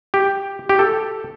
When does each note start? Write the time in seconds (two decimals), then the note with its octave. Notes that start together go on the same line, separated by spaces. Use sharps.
0.14 G4
0.69 G4
0.79 A4